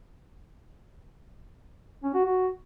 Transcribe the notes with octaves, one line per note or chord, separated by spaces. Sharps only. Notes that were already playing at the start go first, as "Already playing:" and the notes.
C#4
F#4
F#4